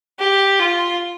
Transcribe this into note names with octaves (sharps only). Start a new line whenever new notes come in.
G4
F4